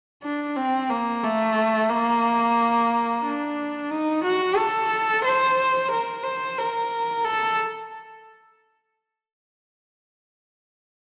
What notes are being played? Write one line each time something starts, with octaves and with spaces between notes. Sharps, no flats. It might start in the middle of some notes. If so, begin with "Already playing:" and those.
D4
C4
A#3
A3
A#3
D4
D#4
F#4
A4
C5
A#4
C5
A#4
A4